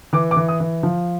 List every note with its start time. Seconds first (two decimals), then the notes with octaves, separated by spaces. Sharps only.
0.13 E3 D6
0.31 D6
0.37 E3
0.48 D#6
0.60 E3
0.83 F3